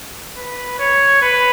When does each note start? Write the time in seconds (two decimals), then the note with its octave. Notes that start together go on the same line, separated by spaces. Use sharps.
0.37 B4
0.79 C#5
1.22 B4